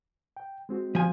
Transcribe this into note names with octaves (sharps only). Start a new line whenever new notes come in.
G5
G#3 C4 F#4
F3 G#5